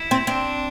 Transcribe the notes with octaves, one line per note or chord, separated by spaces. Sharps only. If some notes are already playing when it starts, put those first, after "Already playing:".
Already playing: E4
C4
C4 D4